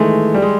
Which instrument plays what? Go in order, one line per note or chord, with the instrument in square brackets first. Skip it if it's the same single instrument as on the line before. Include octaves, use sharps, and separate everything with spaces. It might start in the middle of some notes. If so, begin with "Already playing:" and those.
Already playing: [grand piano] D#3 E3 G#3 A3
G3
G#3